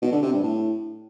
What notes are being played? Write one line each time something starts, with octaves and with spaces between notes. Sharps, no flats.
B2
D3
C3
G2
A2